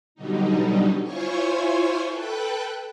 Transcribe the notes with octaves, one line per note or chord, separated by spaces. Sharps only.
B2 D3 F#3 G3 D#4
E4 F4 C5 C#5 G#5 C#6
A4 B4 G5 F#6